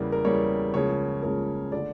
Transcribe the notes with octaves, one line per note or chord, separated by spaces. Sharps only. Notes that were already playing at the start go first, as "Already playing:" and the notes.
Already playing: E2 C#3 G3 A#3
A#4
E2 C#3 G3 A#3 C#5
C#2 C#3 F3 A#3 C#5
C#2 C#3 F3 A#3 A#4
D3 A3 D5